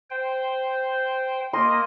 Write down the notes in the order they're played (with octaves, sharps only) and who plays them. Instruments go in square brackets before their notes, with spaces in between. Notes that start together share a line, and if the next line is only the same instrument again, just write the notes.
[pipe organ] C5 G5
[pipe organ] A#3 D#5 [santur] C6